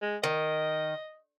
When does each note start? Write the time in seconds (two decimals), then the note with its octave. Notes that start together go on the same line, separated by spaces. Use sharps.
0.02 G#3
0.24 D#3 D#5